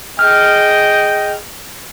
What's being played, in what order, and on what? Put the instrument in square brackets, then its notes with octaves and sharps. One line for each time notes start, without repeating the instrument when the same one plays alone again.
[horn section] G#4 D#5 G5 [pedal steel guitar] F6